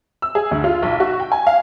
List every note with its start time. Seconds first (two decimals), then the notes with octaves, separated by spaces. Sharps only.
0.22 E6
0.35 G#4
0.51 D2
0.64 F4
0.82 B1
1.00 F#4
1.20 G5
1.32 G#5
1.47 F5